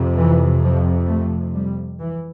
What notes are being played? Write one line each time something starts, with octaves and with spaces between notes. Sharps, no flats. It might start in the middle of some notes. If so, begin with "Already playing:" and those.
Already playing: F2 C3
E3
F3
A3
G3
E3